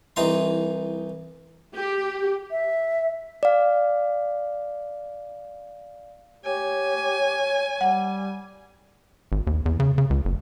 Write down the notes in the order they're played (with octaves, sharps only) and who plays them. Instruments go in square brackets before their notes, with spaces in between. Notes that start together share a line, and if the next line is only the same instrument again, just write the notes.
[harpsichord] C2 E3 D#4 C6
[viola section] G4
[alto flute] E5
[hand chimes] D5 F5
[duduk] G4 [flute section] C#5 [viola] G#5
[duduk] G3 [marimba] F#5
[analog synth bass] G#1
D#2
E2
C#3
C#3
C#2
F#1